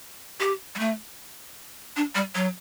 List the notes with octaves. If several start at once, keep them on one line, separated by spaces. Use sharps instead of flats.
G4
G3
A3
D4
G3
F#3